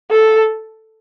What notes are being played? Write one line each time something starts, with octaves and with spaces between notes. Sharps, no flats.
A4